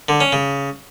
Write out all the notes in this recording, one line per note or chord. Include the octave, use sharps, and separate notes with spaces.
D3
C#4
C#3